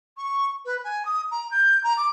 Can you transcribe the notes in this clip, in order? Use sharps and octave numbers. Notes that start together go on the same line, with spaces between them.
C#6
B4
G#5
D#6
A#5
G6
A#5
D6